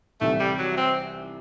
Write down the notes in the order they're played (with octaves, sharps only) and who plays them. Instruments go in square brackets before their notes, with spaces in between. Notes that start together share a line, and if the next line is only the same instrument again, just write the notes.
[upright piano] C2 C3 E3 [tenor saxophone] A3
[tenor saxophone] G3
F#3
C4